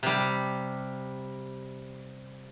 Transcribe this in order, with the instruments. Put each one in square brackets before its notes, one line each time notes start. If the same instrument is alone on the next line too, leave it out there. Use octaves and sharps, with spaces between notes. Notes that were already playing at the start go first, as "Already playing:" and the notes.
[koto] C3 G3